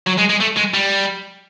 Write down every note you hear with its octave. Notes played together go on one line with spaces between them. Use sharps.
F#3
G#3
G#3
A3
G#3
G3